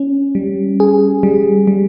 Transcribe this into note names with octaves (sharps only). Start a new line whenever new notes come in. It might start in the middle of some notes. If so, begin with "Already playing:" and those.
Already playing: C#4
G3
G#4
G3
G3